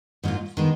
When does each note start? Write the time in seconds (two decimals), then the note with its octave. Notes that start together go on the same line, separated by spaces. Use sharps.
0.24 G#2 F#3 A#3 F4
0.57 D#3 G#3 B3